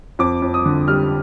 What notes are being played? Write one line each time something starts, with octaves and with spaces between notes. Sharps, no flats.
F2 D6
F2
D#6
D3
G3 F6